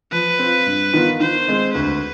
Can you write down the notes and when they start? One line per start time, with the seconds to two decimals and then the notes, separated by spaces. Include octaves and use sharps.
0.12 F3 B4
0.39 C4 F4
0.66 G2
0.94 D#3 B3 F4
1.20 D#3 C5
1.48 G#3 C4
1.74 D2 B4